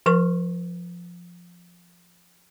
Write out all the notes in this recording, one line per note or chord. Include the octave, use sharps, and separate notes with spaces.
F3 A#4 C#6